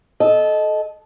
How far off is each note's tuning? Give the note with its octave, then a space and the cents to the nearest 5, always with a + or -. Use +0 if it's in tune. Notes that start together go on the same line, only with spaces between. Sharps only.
A4 -20 D#5 +0